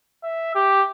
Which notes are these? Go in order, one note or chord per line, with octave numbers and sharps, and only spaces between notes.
E5
G4